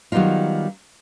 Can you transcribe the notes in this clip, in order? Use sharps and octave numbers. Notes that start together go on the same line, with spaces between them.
D#3 F#3 G3 B3 D#4 F4